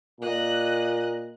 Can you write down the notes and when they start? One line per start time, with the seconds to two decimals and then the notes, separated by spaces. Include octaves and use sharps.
0.21 A#2 D#5 F#6